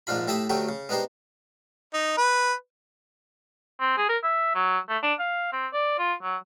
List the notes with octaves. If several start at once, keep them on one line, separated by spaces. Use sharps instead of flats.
A#1 G#2 G#3 D4 F4 B5
A2 G4 E5 A5 B5 D#6
D2 F#3 A3 G4 G5
C#3
G#3 B3 D4 D#4 G4 C5
D#4
B4
C4
G#4
A#4
E5
F#3
A3
D4
F5
C4
D5
F4
F#3